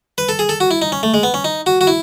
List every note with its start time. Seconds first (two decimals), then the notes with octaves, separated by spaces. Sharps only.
0.18 B4
0.29 A4
0.39 G#4
0.49 A4
0.60 F#4
0.71 E4
0.82 D#4
0.92 C#4
1.03 A3
1.14 G#3
1.23 B3
1.34 C#4
1.44 D#4
1.66 F#4
1.81 F#4
1.87 E4